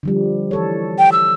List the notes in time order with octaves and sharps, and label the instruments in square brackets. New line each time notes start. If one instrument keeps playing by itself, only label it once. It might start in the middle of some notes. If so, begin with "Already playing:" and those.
[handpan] D3 F3 G3
E3 A4 C#5
[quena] G5
E6